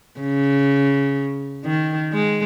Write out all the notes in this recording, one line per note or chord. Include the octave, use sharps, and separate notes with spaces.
C#3
D#3
G#3